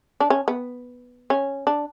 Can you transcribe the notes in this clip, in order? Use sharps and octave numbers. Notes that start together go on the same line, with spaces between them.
D4
C#4
B3
C#4
D4